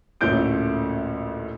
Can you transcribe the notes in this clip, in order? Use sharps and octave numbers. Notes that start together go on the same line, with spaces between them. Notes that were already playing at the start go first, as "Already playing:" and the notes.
A1 D2 A#2 A3 G6 D7